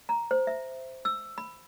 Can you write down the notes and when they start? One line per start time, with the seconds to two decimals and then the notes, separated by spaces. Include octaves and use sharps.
0.09 A#5
0.31 C5
0.47 E5
1.05 E6
1.38 B5